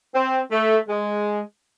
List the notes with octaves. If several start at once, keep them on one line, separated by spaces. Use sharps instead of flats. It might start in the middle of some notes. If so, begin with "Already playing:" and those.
C4
A3
G#3